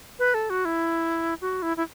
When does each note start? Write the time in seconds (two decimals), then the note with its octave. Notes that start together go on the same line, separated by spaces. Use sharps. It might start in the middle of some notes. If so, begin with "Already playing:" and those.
0.19 B4
0.34 A4
0.50 F#4
0.65 E4
1.41 F#4
1.62 E4
1.77 E4